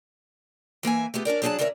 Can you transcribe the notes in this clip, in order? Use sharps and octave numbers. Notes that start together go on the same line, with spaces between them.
E3 A#3 E5 G#5
A3 B3 G4 G#4
C#4 D4 A#4 D5
F#3 D4 G#4 D5 F#5 A5
D3 C#4 D4 A#4 C#5 E5